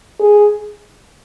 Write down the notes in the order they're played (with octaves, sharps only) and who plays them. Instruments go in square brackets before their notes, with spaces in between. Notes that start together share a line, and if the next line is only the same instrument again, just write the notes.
[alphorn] G#4